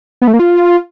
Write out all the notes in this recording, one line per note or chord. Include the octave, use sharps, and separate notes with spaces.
B3
A3
A#3
F4